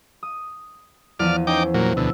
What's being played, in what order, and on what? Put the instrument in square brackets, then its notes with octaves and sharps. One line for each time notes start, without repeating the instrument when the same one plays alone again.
[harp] D#6
[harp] E2 F3 D#7 [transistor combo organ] D5 F6
[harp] C#4 C5 [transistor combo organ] D#4 G5 D6
[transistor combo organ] A#2 F#3
[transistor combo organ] D2 B2 [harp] E6